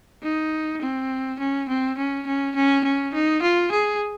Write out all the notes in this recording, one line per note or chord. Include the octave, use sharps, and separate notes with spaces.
D#4
C4
C#4
C4
C#4
C#4
C#4
C#4
D#4
F4
G#4